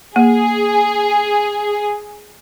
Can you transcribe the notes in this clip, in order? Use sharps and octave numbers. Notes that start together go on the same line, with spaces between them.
A#3 G#4